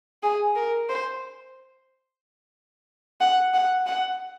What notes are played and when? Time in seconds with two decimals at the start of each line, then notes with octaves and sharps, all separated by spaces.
0.23 G#4
0.56 A#4
0.89 C5
3.21 F#5
3.54 F#5
3.86 F#5